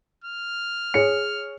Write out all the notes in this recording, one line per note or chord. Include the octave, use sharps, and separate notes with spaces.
F6
G#4 C#5 C#7